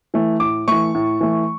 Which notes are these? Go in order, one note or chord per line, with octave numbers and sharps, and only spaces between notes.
E3 A3
A2 D6
E3 A3 C#6
A2
E3 A3